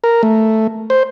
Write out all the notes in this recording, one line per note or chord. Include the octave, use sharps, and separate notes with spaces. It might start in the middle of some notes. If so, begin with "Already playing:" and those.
A#4
A3
C5